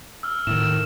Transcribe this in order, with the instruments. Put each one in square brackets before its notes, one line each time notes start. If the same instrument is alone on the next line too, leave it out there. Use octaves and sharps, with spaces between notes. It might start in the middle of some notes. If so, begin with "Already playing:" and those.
[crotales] E6 F6
[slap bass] A2 D#3 [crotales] E7